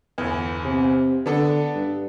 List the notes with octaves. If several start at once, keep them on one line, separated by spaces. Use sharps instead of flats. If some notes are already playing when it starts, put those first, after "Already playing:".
G1 E2
C3
D3 B3 D4 A4
G2